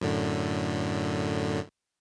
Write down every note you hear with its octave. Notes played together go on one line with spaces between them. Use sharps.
F#2 A2 D3